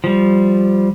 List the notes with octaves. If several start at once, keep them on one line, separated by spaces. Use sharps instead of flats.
F3 G3